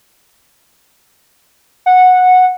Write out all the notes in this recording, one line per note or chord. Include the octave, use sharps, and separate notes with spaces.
F#5